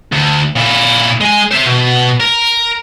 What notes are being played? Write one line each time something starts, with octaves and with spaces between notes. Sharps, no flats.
D2
A#2 E4
G#3 G#5
C5 E5
B2
A#4